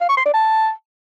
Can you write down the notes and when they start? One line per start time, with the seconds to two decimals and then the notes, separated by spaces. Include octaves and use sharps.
0.01 F5
0.09 C#6
0.17 C6
0.26 D5
0.34 A5